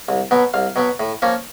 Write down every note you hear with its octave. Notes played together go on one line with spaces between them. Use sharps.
C2
B2 F#3 B3
C2 F5
B2 F#3 B3
A2
F3 A#3 C#4